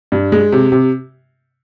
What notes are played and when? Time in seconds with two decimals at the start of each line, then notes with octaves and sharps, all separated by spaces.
0.12 G2
0.32 G#3
0.52 C3
0.72 C3